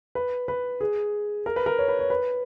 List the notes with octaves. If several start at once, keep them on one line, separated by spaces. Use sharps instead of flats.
B4
B4
G#4
A#4
B4
A#4
C#5
B4
C#5
B4